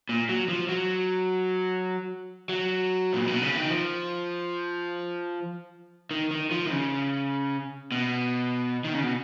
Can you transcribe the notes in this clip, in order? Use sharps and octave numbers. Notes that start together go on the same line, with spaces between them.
A#2
F#3
F3
F#3
F#3
A#2
B2
C#3
D#3
F3
D#3
D#3
F3
D#3
C#3
B2
D#3
C#3
B2